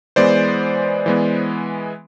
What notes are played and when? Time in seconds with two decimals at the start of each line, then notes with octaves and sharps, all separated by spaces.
0.16 E3 G#3 B3 C5 D5
1.06 E3 G#3 B3